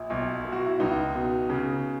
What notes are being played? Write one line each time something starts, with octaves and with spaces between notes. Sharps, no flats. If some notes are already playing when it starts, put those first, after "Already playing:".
Already playing: A#1
B1
B2
F#4
E4
C#2 D#4
B2
C#3